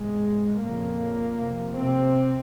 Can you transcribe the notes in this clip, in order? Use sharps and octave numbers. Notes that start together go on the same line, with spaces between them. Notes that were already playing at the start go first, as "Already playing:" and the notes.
Already playing: E2 G#2 C3 G#3
F2 A#2 C#3 A#3
F2 C3
C3 C4